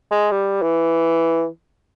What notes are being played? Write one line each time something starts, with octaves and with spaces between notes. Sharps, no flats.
G#3
G3
E3